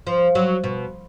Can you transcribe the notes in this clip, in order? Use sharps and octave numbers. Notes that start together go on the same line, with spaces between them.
F3
F#3
B2